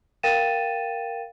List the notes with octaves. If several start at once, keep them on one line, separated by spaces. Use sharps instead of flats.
A#4 F5 G5 A6 D#7 E7